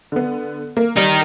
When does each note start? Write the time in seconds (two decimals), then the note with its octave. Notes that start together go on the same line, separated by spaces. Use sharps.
0.12 D3 B3
0.77 A#3
0.97 G3 D#4 A#4